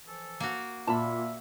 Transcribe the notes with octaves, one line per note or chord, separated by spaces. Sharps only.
E3 F3 A4
A#3 F#4
A#2 E5 A5 B5